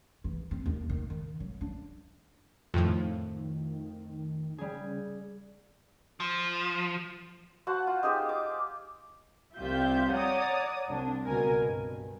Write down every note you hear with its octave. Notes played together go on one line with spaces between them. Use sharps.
E3
C4
D#2
D#3
D#3
F#3
D4
F2 A2 D#3 F3 A3 E6
C#3 G3 G#4
F3
F#4 C5 F#5 A5
F4
D#4 G4 G#4 C5
D6
C2 F4 G4 E5 G6
C#5 D5 F#5 A#5 D#6
C2 D4
C#2 B2 A#4 G#5
G2